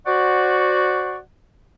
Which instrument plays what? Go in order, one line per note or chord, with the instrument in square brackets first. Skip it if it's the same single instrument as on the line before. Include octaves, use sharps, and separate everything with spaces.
[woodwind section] F#4 C5 D5 F#5 C#6